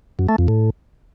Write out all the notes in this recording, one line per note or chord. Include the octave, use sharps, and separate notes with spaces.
F#2
A3
F2
A2